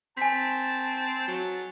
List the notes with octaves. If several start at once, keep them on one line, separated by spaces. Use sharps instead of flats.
C4 G#5 A5 B6
F#3